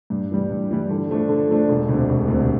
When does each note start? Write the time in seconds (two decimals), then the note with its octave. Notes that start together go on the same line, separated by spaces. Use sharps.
0.10 G2
0.31 E3 G3
0.51 G2
0.71 E3 G3
0.90 D3
1.10 F3 A3 D4
1.29 D3
1.50 F3 A3 D4
1.69 E1
1.89 D2 C3
2.09 E1
2.28 D2 C3